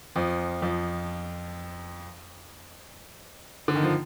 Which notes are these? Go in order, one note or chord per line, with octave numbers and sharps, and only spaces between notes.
F2 F3
F2 F3
D3
D#3
F3